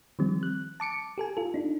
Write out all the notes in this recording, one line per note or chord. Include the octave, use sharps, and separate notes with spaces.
D#3 F3 G3 C4
F#6
A5 D6 C#7 D7
G4 A4 G#5
F4 A4
D4 D#4